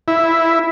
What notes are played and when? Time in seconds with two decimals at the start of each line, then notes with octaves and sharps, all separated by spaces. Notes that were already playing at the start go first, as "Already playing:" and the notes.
0.08 E4